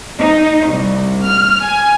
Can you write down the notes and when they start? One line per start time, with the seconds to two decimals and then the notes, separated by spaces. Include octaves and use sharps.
0.20 D#4
0.71 C2
1.28 F6
1.64 G#5